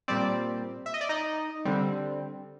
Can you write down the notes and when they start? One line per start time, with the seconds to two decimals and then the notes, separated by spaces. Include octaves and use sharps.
0.08 A#2 G3 C4 D5
0.86 E5
0.94 D#5
1.01 D5
1.09 D#4 D#5
1.65 D3 G3 C4